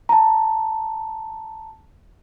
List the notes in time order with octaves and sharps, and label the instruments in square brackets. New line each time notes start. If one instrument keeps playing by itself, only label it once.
[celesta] A5 A#5